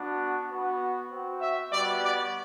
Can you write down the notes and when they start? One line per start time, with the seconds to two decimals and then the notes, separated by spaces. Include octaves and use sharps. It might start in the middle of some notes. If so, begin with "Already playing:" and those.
Already playing: B3 D4 F#4
0.49 B3 F#4
1.10 C4 F#4
1.41 E5
1.72 G3 B3 F#4 D5
2.03 D5